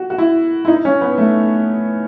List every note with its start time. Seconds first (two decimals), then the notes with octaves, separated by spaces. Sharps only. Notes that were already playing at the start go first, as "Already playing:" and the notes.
Already playing: F#4
0.10 F#4
0.18 E4
0.65 E4
0.68 D#4
0.85 C#4
1.01 B3
1.18 A3